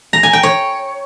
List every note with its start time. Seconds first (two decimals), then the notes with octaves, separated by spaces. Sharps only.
0.13 A#5
0.23 G#5
0.33 G5
0.43 C#5